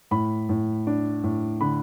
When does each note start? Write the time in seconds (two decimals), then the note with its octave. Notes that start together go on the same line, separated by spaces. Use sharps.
0.11 A2 B5
0.49 A2
0.87 D4
1.24 A2
1.61 D3 B5